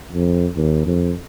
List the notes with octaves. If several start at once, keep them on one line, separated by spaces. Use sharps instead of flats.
F2
D#2
F2